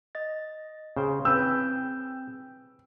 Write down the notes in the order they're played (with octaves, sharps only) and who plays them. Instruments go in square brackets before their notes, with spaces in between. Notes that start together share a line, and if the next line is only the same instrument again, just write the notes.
[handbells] D#5 A6
[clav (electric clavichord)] C#3 C5 G5 [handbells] C#4 G#4
[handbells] C4 G5 G6 [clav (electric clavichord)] G#4 B4 [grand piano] E6